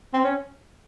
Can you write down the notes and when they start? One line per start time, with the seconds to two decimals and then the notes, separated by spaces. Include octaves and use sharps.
0.14 C4
0.24 C#4